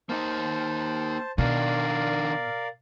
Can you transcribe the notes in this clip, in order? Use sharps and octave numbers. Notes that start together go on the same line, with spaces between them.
A#3 D#4 C5 A5
B2 D#3 D4 A#4 D5 F5